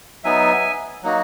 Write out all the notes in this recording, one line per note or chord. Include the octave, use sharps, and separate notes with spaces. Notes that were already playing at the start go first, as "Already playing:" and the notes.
F#3 B3 D#4 E5 G#5
F#3 A#3 D#4 F#4